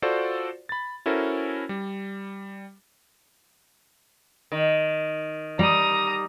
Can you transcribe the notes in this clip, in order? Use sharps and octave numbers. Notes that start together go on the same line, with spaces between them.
F4 F#4 A4 C5 D5
B5 A6
C#4 E4 F#4 A4 A#4 C5
G3
D#3
G3 A#5 D#6